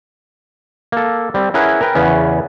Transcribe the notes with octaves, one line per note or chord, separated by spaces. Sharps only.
A#3 A4
G3 C4
C#4 E4 G#4 A#4 B4 F#5
A#4 B4 G5
E2 C#3 B3 C#4